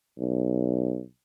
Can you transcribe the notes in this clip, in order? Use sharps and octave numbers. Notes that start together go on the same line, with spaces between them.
B1